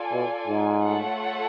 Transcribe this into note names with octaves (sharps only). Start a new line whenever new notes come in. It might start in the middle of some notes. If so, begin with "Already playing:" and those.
Already playing: F4 A4 D5 G#5
B2
G#2
A3 F4 A4 C#5 F#5